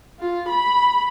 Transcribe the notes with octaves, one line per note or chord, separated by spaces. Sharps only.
F4
B5